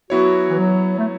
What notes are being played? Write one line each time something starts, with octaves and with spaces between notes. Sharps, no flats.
F#3 B3 E4 F#4 C#5
E3
F#3
A3